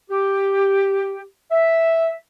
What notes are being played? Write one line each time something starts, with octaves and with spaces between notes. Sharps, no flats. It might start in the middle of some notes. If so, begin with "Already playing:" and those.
G4
E5